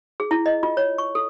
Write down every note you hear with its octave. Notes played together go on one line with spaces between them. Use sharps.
G#4
E4
D#5
F4
C#5
C#6
A4